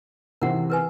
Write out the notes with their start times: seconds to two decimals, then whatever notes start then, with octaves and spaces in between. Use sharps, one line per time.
0.42 C3 E3 C4 A#4 F#5
0.70 A#4 B4 G#5